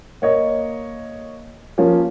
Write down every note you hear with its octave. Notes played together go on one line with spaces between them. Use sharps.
A#3 C#5 D#5
F3 A#3 C#4